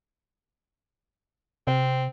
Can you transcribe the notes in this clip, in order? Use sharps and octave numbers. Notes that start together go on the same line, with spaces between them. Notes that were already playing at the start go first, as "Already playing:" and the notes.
C3 C4